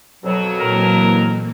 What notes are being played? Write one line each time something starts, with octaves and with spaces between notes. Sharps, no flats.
F2 B2 F#3
A#2 E3 A#3 A#4